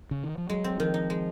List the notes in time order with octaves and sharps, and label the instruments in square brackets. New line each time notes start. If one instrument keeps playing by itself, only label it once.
[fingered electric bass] C#3
D#3
F3
[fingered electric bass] F#3 [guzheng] G#3
[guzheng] C4
[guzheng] D#3 [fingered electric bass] F3
[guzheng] D#4
G#3